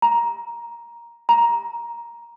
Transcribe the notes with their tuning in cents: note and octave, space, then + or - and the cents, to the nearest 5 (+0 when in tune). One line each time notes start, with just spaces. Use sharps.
A#5 +10
A#5 +10